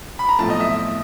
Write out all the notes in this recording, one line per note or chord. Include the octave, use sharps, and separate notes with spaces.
B5
A#5
B1 A2 F3 A3 C4 A5
D#5
E5